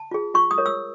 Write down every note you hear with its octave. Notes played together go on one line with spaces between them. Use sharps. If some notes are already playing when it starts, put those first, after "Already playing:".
Already playing: A5
F4 G#4
F4 C#6
D#6
A#4 C#5
E6